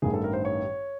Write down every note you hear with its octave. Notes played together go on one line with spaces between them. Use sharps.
A1 G2 D#3 G#4
A4
A#4
C5
C#5